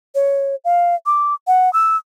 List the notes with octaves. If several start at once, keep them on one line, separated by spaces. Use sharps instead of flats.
C#5
F5
D6
F#5
E6